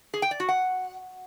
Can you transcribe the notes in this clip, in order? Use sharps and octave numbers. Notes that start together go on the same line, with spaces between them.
G#4
G5
D5
F#4
F#5